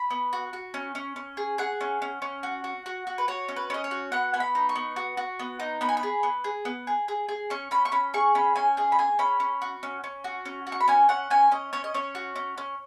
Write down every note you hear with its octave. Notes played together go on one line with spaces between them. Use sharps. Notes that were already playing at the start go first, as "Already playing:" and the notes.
Already playing: B5
B3
F#4
F#4
C#4
C#4
C#4
G#4
G#4 F#5
C#4
C#4
C#4
F#4
F#4
F#4
F#4
B4
F#4 C#5
C#4
B4
C#4 D#5
C#5
F#4
B3 F#5
B3 G#5
B5
D#4
C#6
B3
F#4
F#4
B3
D#4
B3 B5
G#5
B5
G#4
B3
G#4
B3
G#4
G#4
G#4
C#4 C#6
C#4 B5
C#6
C#4 B5
G#4 C#6
C#4 B5
C#4 G#5
G#4 D#5
B5
G#4 G#5
C#4 B5
C#4
F#4
C#4
C#4
F#4
C#4
F#4
C#6
B5
C#4 G#5
C#4 F#5
C#4 G#5
C#4 D#5
C#4 C#5
D#5
C#4 C#5
F#4
C#4
C#4